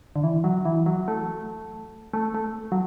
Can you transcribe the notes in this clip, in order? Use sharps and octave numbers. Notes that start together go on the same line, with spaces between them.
D3
E3
F#3
E3
F#3
A3
A3
A3
F#3